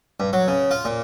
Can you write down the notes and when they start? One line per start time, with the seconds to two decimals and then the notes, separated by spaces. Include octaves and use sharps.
0.20 G2
0.33 F#3
0.48 C#3
0.71 F4
0.85 A#2